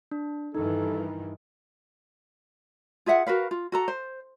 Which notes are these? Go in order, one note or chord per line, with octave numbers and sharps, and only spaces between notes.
D4
G2 D#3 E3 D#4 A4
F4 G#4 E5 F#5
F#4 A#4 B4 F5
F4
F#4 A4 A#5
C5